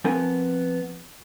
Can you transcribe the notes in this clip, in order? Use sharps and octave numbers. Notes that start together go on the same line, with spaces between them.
F3 B3 C4 A#4 G#5